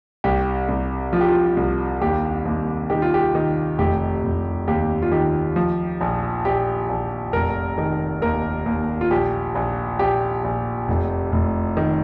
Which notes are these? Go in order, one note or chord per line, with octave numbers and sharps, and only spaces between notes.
C2 G4
C2
F3 F4
G4
F4
C2
D#2 G4
D#2
D#3 G4
F4
G4
D#3
F1 G4
F1
D#2 G4
F4
D#3 G4
F3
A#1
A#1 G4
A#1
F1 A#4
D#3
D#2 A#4
D#2
F4
A#1 G4
A#1
A#1 G4
A#1
F1
F1
D#3